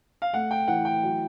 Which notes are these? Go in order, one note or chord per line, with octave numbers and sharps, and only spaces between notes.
F5
A3 F#5
G5
E3 F#5
G5
F#3